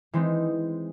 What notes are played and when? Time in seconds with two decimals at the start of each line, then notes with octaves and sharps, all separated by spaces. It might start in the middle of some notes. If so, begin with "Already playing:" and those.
0.13 E3 G#3 C4 D#4